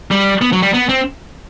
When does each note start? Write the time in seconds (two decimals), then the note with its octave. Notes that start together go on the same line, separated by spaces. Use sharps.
0.11 G3
0.42 B3
0.53 F#3
0.62 G3
0.74 B3
0.89 C4